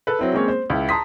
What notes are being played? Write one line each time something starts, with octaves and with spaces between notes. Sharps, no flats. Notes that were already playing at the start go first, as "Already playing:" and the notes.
A4 B4
F#3 C4 E4
G#3 A#3 C4 C#4 C#5
C5
C#2 E4
A5 A#5 C6 D#6 B6